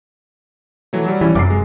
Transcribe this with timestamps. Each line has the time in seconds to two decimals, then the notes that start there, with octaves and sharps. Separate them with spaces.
0.93 E3 F#3 A3
1.06 F#3 G3
1.21 E3 G3 C#4
1.35 F1 F#2 D6 C7
1.50 G#3